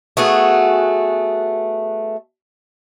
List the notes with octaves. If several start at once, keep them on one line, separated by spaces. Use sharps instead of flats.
A3 B3 F#4 G#4